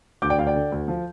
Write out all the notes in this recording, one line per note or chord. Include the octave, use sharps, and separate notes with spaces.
D2 D6 G6
D5 G5
D2 F5
D5 G5
D3
D2
F3